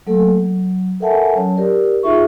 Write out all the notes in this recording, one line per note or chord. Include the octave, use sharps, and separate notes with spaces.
F#3 A3 A#3 A4
F#3
A4 A#4 E5 F#5 G#5 A5
F#3 C#4 C#5 A5
G4 A#4 D5
D#4 F4 G#4 E5 C#6